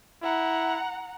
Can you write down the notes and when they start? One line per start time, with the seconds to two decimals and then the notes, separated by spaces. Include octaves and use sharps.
0.23 E4 F#5 A#5